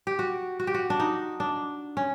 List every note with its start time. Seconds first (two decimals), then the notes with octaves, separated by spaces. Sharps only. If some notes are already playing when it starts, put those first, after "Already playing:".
0.07 G4
0.19 F#4
0.60 F#4
0.67 G4
0.74 F#4
0.90 D4
1.00 D#4
1.40 D4
1.97 C#4